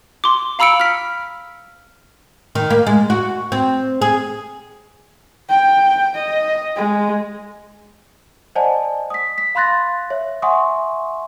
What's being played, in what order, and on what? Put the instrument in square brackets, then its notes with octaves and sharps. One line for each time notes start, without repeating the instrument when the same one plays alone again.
[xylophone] C6 D6
F5 A#5 B5 E6 C#7 D7
F6 B6
[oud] D#3
A#3
G#3
F#4
C4
G#4
[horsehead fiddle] G5
D#5
G#3
[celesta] C5 D5 D#5 F#5 G#5 A5
D#6 B6
B6
F5 B5 C6 F#6 A6 A#6
C#5 E5
E5 F#5 G#5 C6 C#6 D#6